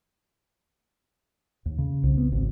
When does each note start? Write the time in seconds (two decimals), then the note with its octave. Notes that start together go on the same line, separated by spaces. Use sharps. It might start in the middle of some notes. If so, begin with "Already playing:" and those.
1.66 D#2
1.78 C#3
2.03 C2
2.17 B3
2.32 G#1